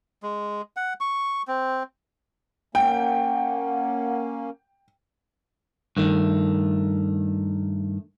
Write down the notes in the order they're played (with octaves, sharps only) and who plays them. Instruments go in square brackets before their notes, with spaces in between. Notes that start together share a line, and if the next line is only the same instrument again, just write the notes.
[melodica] G#3
F#5
C#6
C4
[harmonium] A#3 C#4 [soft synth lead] F#5 [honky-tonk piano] G5
[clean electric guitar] G2 D#3 A3